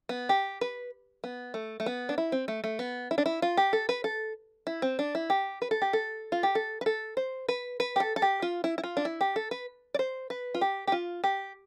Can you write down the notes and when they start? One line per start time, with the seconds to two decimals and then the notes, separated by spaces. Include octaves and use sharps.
0.09 B3
0.29 G4
0.61 B4
1.24 B3
1.54 A3
1.80 A3
1.86 B3
2.09 D4
2.18 E4
2.32 C4
2.48 A3
2.64 A3
2.79 B3
3.11 E4
3.18 D4
3.26 E4
3.42 F4
3.57 G4
3.73 A4
3.89 B4
4.04 A4
4.67 E4
4.82 C4
4.99 D4
5.15 E4
5.30 G4
5.62 B4
5.71 A4
5.82 G4
5.93 A4
6.32 F4
6.43 G4
6.55 A4
6.81 B4
6.86 A4
7.17 C5
7.49 B4
7.80 B4
7.96 G4
8.00 A4
8.16 A4
8.22 G4
8.42 F4
8.64 E4
8.78 E4
8.84 F4
8.97 D4
9.05 E4
9.21 G4
9.36 A4
9.51 B4
9.94 D5
9.99 C5
10.30 B4
10.54 F4
10.61 G4
10.87 G4
10.92 F4
11.24 G4